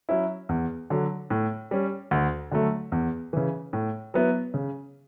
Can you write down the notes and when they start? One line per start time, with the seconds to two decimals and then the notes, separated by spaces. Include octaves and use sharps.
0.09 F#3 C#4 E4
0.49 E2
0.90 D3 F#3
1.30 A2
1.71 G3 C#4
2.11 D2
2.51 D3 F#3 A3
2.92 E2
3.33 C#3 E3
3.73 A2
4.14 F#3 B3 E4
4.54 C#3